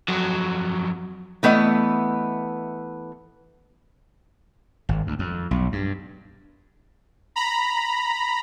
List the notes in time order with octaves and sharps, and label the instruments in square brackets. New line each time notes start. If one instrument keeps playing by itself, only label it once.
[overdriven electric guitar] F2 F#3
[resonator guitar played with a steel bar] E3 A3 B3 D#5
[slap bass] G#1
D2
F2
B1
G2
[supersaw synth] A#5 B5